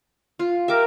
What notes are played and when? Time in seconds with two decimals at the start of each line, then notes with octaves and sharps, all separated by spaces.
0.39 F4
0.68 G4 A#4 E5 D6